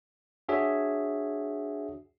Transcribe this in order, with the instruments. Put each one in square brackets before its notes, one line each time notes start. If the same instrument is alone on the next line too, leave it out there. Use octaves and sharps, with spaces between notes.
[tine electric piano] D4 F#4 G#4 C#5 E5